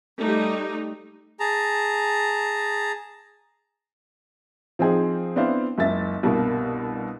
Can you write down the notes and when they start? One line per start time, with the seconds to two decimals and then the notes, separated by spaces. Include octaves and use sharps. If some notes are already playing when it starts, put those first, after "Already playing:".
0.18 G3 A3 D#4
1.40 G#4 A5 A#5
4.79 F3 C4 D#4 G#4 C5
5.36 B3 C4 D4 E4 C5 F5
5.78 F#1 C#2 E5 A6
6.23 C2 G2 B2 A#3